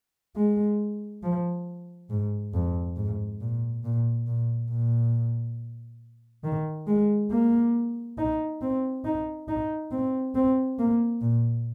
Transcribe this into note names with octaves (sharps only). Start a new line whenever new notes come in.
G#3
F3
G#2
F2
G#2
A#2
A#2
A#2
A#2
D#3
G#3
A#3
D#4
C4
D#4
D#4
C4
C4
A#3
A#2